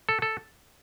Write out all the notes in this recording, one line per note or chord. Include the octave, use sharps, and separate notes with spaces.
A4
A4